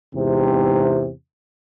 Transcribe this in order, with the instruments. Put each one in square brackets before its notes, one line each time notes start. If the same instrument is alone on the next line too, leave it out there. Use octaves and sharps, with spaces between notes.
[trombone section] E2 G#2 C3